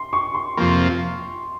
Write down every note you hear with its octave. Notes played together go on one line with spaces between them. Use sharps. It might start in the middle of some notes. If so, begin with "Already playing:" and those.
Already playing: C6
C#6
C6
F2 C3 F3 A#3 C6